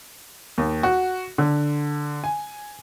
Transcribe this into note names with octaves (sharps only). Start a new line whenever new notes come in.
D#2
F#4
D3
G#5